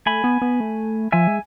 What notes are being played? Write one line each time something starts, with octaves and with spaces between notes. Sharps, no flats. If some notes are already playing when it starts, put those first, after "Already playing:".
A3 G#5 B5
B3
B3
A3
F3 E5 G#5
G#3